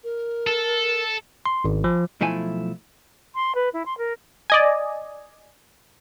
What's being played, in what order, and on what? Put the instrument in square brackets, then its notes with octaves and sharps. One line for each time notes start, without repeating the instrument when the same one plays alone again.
[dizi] A#4
[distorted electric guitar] A4
[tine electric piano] C6
G#1
F3
[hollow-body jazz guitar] B1 F3 A3 E4 G#5
[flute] C6
B4
E4
C6
A#4
[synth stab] D5 D#5 G#5